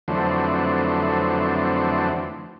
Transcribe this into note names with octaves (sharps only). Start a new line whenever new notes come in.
F2 D3 E3 F#3 A3 C4